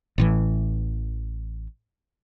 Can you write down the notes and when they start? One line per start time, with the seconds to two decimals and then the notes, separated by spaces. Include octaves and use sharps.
0.18 A1 A2 E3